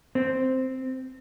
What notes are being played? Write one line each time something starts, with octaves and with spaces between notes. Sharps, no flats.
C4